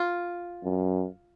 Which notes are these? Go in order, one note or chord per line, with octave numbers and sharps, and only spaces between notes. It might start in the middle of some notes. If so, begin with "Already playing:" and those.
Already playing: F4
F#2